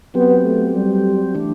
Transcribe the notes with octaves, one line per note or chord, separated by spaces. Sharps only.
F#3 B3 C4 G4
A3
G3
E3 A3 D4